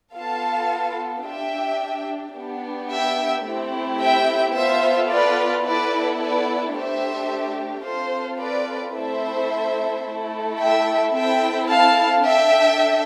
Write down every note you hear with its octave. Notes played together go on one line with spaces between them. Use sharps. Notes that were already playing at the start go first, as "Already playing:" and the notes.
B3 F4 A4 F5 A5
D4 G4 E5 G5
B3 D4 G4
E5 G5
A3 C4 E4 G4
E5 G5
B3 F4 A4 C5 E5
B4 D5
B3 E4 A4 B4 D5
B4 D5
A3 D4 G4 C5 E5
C4 F4 A4 C5
B4 D5
A3 C4 E4 A4 C5 E5
A3 E4 A4
E5 G5
C4 E4 A4 E5 G5
F5 A5
D4 A4 E5 G5